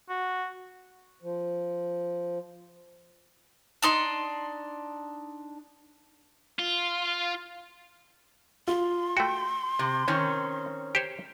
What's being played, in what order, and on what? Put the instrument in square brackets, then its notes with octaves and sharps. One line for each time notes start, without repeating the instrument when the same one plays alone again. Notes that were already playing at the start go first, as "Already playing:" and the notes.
[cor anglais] F#4
[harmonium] F3
[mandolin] D4 D#4 C6
[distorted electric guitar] F4
[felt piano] F4 [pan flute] C6
[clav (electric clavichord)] A3 F#4 [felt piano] G5
[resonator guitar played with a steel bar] C3
D#3 C4 C#4
[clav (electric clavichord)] G4 C5 C#5